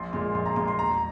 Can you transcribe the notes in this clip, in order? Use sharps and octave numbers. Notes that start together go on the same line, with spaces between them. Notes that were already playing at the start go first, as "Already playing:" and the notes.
Already playing: A#1 C6
A#2 G#3 C6
A#1 C6
A#5
A#2 G#3 C6
C6
E1 A#5